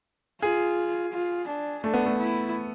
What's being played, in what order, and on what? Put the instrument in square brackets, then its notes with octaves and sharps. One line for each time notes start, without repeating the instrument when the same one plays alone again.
[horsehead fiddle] F4 [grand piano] G#4
[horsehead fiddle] F4
D4
[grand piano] A3 [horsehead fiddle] D4
[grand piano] B3
A3
[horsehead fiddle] E4